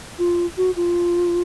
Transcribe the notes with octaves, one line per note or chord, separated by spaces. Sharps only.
F4
F#4
F4